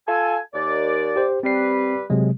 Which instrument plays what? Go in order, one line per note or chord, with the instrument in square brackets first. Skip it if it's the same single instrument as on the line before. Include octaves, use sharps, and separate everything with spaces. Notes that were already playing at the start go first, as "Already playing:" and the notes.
[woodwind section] F4 A4 G#5
D#2 D5
[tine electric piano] G4 C5
[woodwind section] G3 B4 [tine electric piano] C4 C7
[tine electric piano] C3 F#3 G#3